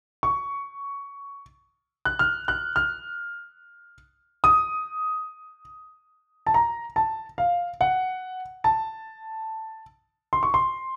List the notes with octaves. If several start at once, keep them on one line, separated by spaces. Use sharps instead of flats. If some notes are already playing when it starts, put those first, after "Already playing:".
C#6
F#6
F6
F#6
F6
D#6
A5
A#5
A5
F5
F#5
A5
C6
C#6
C6